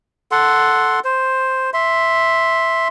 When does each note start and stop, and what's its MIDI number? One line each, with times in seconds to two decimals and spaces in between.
0.32 1.00 69
0.32 1.00 78
0.32 1.00 84
1.04 1.70 72
1.74 2.88 76
1.74 2.88 84